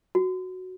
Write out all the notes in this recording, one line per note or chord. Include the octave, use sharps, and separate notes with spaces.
F#4